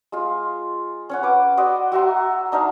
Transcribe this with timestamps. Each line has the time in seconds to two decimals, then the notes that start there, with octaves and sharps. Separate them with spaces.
0.12 G#3 F4
1.09 C#4 C#5 F#5
1.23 B4 D6
1.57 F#4 D5 D#5 C6
1.92 F#4 E5 A#5 C6
2.52 D4 D#4 E5 F5